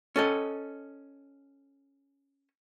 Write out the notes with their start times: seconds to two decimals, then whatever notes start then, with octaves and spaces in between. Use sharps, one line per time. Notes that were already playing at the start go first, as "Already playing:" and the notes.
0.16 C#4 A4 D#5